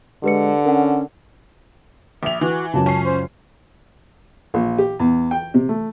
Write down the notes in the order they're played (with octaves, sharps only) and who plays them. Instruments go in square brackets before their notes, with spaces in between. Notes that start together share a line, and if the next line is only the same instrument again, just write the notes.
[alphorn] D3 [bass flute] G#3 [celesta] G4 B4 C#7
[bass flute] C#4 [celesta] A#4 F#5
[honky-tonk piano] A#1 F7 [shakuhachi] E5
[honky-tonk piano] E3 [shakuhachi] F#4
[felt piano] C#2 F#2 [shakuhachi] A5
[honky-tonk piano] C#4 C7
[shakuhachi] C5
[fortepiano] A#1
G4
E2
G5
C3
A3